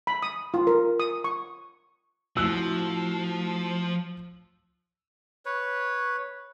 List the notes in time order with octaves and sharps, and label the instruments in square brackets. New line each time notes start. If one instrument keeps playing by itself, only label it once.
[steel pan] B5
D#6
F4
A#4
D#6
C#6
[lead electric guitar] F3 [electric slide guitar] A3 E4 F#4 [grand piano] E6 F#6
[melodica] B4 C#5